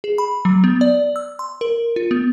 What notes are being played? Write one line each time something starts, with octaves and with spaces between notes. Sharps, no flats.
G#4
B5
F#3
B3
D5
E6
C6
A#4
F4
B3